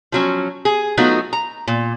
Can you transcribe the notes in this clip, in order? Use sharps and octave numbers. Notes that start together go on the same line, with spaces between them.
F3 F#3 C#4
G#4
F#3 A3 B3 D#4 F4 F#4
A#5
A#2